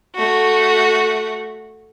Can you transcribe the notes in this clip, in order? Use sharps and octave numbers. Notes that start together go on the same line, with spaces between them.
A3 F#4